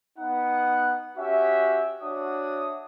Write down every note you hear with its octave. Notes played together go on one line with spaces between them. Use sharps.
B3 D#4 F#5
C#4 F#4 G4 E5
D4 F#4 C#5 E5 D#6